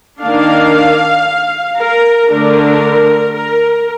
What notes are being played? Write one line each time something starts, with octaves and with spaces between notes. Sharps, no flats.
D#3 A#3 D4 F5
A#4
D3 A3 D4 A#4
A#4